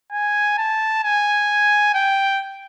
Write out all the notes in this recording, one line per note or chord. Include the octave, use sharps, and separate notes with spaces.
G#5
A5
G#5
G5